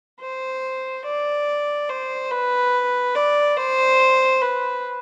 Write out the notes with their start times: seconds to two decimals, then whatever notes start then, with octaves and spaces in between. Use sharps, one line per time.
0.21 C5
1.05 D5
1.89 C5
2.31 B4
3.15 D5
3.57 C5
4.42 B4